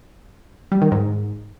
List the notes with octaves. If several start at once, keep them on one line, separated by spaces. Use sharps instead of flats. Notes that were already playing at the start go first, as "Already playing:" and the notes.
G3
D#3
G#2